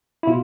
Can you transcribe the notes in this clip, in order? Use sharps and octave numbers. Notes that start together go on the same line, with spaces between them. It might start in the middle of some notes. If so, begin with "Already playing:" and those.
E4
B2 F4